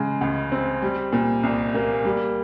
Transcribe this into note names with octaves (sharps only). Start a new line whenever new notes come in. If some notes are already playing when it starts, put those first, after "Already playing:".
Already playing: C#3 G#3
C#2
C4
G3
A#2
C2
A#3
G3